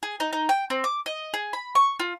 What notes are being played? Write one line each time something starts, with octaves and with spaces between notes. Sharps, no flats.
G#4
D#4
D#4
G5
C4
D6
D#5
G#4
B5
C#6
F4